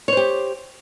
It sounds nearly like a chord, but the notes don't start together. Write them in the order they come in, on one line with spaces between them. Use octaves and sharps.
C#5 C5 G4